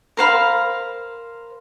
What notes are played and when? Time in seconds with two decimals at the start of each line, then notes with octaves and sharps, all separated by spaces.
0.17 A#4 C5 F5 B5